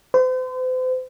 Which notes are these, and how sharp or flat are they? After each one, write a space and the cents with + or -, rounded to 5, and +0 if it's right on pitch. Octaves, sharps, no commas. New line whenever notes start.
C5 -40